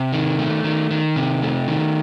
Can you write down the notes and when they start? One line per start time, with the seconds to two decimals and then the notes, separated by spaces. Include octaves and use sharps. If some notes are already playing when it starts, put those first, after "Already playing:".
Already playing: C3
0.13 D#3
0.39 A3
0.64 D#3
0.91 D#3
1.16 C3
1.42 A3
1.68 D#3